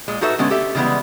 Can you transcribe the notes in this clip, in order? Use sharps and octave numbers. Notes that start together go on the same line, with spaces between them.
A#2 G#3
D#4 F#4 A4 B4 E5
D3 G#3 B3 C#4
G4 A4 E5
C#3 E3 G3 G#3 B3